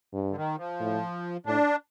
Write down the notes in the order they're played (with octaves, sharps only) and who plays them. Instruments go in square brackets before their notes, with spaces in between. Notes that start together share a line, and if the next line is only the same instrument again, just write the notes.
[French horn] G2
[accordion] D3
D#3
F3
[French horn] A2
[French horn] A2 [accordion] D4